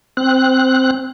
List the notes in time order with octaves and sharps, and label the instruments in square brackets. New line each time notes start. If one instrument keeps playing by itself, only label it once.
[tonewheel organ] C4 F#6